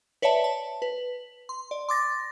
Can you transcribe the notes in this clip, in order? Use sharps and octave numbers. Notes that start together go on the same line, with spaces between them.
B4 C#5 D5 E5 A5
A5
B4
C6
D5
C6 D6 A6 A#6